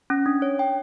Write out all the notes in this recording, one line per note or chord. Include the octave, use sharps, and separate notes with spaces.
C#4
D4
C#5
G5